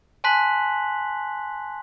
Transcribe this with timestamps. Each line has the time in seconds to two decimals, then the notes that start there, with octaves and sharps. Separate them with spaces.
0.24 G#5 A5 C6 F#6 B6 F#7